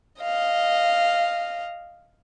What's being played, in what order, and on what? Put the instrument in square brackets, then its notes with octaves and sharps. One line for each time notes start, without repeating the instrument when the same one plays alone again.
[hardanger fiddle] D#5 F5